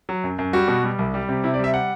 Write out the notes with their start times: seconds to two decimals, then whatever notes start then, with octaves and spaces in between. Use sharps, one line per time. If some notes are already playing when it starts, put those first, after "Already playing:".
0.09 F#3
0.24 F#2
0.39 F#2
0.53 G3 F#4
0.68 B2
0.83 G3
0.99 C2
1.14 G3
1.29 C3
1.44 C3 E4
1.54 D5
1.59 G3
1.64 E5
1.74 F#5